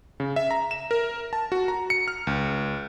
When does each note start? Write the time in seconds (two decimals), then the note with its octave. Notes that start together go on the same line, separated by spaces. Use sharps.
0.20 C#3
0.36 E5
0.51 A#5
0.71 E7
0.91 A#4
1.33 A5
1.52 F#4
1.68 A#5
1.90 C#7
2.08 F6
2.27 C#2